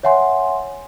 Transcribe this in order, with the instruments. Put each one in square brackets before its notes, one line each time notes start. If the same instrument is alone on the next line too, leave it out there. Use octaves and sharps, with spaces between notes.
[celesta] C#5 E5 F#5 G#5 C6